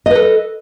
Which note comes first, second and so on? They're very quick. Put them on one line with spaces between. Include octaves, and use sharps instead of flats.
D#5 B4 A4